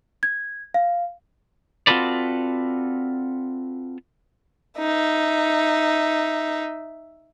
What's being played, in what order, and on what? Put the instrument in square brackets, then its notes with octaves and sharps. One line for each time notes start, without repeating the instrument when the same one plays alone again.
[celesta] G#6
F5
[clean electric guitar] C4 F4 F#4 A4 B4 D5
[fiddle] D#4 E5